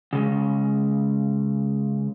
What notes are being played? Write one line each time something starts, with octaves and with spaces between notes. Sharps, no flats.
C#3 G#3